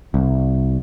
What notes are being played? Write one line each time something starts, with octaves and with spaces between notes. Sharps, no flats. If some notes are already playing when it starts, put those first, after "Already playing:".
C2